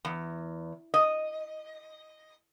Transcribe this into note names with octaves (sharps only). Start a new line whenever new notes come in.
E2
D#5